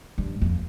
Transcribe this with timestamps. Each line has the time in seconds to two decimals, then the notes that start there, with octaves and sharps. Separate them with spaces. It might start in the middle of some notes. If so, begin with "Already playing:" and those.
0.18 G2
0.42 F2